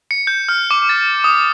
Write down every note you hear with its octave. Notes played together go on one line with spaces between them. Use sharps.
C#7
G6
F6
D6
A6
D#6